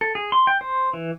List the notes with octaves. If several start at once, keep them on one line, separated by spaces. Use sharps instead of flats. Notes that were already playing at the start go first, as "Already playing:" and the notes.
A4
G#4
C6
G5
C5
E3